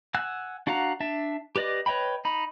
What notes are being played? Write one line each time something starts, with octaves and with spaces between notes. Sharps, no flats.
F#5 G#5 E6 F#6
D4 F#4 F5 F#5 A#5
D4 E5 A5
G4 B4 D5 D#5 D6
B4 C#5 D#5 G5 B5
D#4 B5